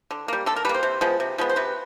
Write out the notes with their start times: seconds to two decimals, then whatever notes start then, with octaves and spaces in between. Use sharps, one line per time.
0.11 D3
0.28 G3 A#3
0.46 D3 A4
0.56 A#4
0.65 G3 B4
0.69 A#3
0.74 C5
0.83 C3
1.01 F3 G#3 B3
1.20 C3
1.38 F3 G#3 B3
1.49 C5
1.56 C3 B4